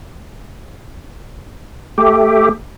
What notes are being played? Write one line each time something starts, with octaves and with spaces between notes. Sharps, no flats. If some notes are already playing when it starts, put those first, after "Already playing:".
A3 G4